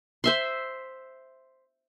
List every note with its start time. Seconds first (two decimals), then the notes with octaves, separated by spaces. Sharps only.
0.24 C5 E5 C6